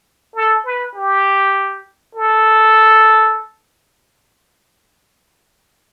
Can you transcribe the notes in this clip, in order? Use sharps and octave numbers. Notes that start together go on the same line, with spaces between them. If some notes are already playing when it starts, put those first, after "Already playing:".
A4
B4
G4
A4